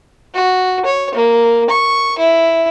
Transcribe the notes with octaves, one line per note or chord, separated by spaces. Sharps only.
F#4
C#5
A#3
C#6
E4